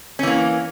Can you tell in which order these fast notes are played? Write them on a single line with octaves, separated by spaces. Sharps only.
C#4 E3 A#3